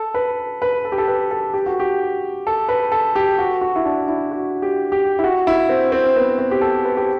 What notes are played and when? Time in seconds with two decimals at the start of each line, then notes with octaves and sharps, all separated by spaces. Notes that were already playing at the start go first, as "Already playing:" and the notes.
Already playing: A4
0.14 B4
0.62 B4
0.85 A4
0.92 G4
0.98 A4
1.08 B4
1.31 A4
1.54 G4
1.66 F#4
1.80 G4
2.47 A4
2.69 B4
2.92 A4
3.16 G4
3.39 F#4
3.61 F#4
3.76 E4
3.85 D4
4.08 E4
4.31 F#4
4.62 G4
4.92 G4
5.19 E4
5.24 F#4
5.47 E4
5.69 C4
5.92 C4
6.16 B3
6.39 C4
6.51 G4
6.61 A4
6.85 B4
6.97 G4